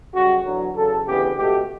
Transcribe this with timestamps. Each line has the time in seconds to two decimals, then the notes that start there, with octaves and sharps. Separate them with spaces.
0.14 F#2 C#3 G3 F#4
0.45 E2 D3 F#3
0.76 E2 C#3 F#3 A4
1.06 D2 C#3 E3 B3 G4
1.36 C#2 B2 A3 G4